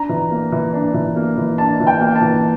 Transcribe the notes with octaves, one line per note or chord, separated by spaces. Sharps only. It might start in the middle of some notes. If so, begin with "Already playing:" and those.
Already playing: D4 A#5
E3
A#3
E3
D4
E3
A#3
E3
D4 A5
E3
G5
A#3
A5
E3